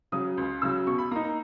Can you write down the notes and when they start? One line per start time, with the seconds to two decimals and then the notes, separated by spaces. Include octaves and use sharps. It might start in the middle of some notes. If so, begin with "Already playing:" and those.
0.12 C#3 F#3 D#6
0.37 C#2
0.62 C#3 F#3 E6
0.87 B2 C#6
0.98 B5
1.11 A#3 D#4 A#5
1.24 A#5